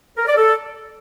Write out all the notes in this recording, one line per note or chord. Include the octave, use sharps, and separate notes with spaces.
A#4
D5
A4